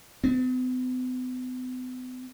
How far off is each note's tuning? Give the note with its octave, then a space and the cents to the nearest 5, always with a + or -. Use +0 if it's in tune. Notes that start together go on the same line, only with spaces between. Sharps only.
B3 +45